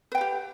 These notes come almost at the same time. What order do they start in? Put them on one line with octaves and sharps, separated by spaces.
B4 G5 F5 G4